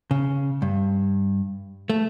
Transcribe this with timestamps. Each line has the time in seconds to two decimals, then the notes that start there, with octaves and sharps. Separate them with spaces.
0.11 C#3
0.62 G2
1.90 A3